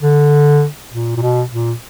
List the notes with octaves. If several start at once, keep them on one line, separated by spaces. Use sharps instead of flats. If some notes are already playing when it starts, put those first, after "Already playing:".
D3
A#2
A#2
B2
A#2